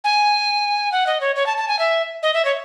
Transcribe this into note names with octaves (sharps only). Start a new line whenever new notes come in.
G#5
F#5
D#5
C#5
C#5
A5
A5
G#5
E5
D#5
E5
C#5